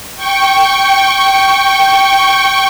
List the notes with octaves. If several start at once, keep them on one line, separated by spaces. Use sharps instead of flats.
G5 C#6